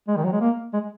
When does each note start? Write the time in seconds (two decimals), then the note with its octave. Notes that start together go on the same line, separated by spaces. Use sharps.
0.08 G#3
0.17 D#3
0.24 F#3
0.33 G#3
0.41 A#3
0.73 G#3